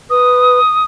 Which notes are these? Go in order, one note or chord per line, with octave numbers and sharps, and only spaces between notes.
B4 D#6